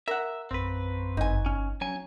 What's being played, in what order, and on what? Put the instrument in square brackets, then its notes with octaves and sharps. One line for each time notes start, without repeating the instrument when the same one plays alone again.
[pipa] A#4 F#5 [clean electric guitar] E5
[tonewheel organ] A#1 F#2 [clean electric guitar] C4 B4
[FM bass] G1 [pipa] D#4 G#5
[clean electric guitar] C#4
[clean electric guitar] F#3 G#5 [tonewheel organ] C#4